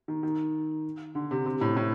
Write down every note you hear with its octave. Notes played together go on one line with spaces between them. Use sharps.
D#3
D#3
D3
C3
C3
A2
A2